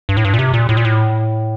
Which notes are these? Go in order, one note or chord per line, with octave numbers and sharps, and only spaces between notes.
G2
A2
G2
A#2
C3
A#2
A2
A#2
A2